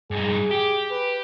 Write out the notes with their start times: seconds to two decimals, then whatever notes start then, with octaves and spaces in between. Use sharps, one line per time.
0.11 G2 D#4 G#4
0.51 G4
0.91 B4